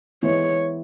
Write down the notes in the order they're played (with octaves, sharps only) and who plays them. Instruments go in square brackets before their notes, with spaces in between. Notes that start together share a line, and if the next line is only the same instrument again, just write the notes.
[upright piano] E3 G#3 B3 E4 [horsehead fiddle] C#5